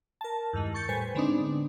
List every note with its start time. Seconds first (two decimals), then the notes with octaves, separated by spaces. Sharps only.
0.21 A#4 A5
0.53 E2 G2 D#3 G#3
0.74 C#6 G6 A6 C#7
0.89 A2 G3 B4 C5 G#5
1.15 D3 G#3 B3 C4 D4 D#4